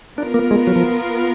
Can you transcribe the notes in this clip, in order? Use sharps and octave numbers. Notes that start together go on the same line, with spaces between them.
B3 D4 F4 A#4
A#3
G#3
F#3
F3